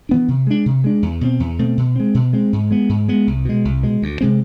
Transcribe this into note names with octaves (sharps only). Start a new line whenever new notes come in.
E3 B3 D4
C3
G#3 D4
C3
G#3 D4
E2
B2 A3 C4
E2
B2 A3 C4
B2
G#3 C4
B2
G#3 C4
G#2
G#3 B3
G#2
G#3 B3
C2
B2 G#3
C2
B2 G#3
D2
C3 G#3 C4